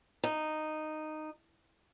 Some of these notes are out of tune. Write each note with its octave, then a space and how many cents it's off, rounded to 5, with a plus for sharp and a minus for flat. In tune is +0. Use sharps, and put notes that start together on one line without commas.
D#4 -10